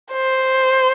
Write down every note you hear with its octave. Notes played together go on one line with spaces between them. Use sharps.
C5